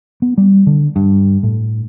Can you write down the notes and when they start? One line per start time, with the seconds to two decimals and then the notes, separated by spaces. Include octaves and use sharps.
0.22 B3
0.38 G3
0.67 D3
0.96 G2
1.43 A2